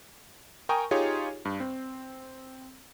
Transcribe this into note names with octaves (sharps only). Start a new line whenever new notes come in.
A#4 G5 G#5 A#5 C#6 D#6
D#4 F4 G4 G#4 C#5 G#5
G2
C4